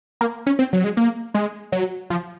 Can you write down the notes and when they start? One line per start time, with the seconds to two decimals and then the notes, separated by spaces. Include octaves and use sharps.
0.21 A#3
0.46 C#4
0.59 C4
0.73 F#3
0.84 G#3
0.97 A#3
1.34 G#3
1.72 F#3
2.10 F3